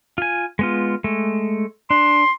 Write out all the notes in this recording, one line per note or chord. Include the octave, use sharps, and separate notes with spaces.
F4 G#5
G#3 B3 F4
G#3 A3
D4 C6